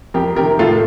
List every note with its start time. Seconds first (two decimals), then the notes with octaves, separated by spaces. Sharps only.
0.14 F2 G4 A#4
0.36 C3 D#3 G4 A#4
0.59 A2 F4 A4